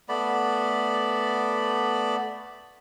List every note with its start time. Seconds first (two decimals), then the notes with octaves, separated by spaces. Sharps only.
0.09 A3 B3 D5 B5